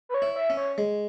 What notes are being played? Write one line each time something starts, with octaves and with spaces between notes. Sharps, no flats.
B4
C#5
E4
E5
C#4
C#5
G#3